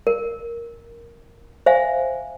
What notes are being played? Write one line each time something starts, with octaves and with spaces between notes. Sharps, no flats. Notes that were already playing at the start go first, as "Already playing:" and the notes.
A#4
C5 E5 F5 G#5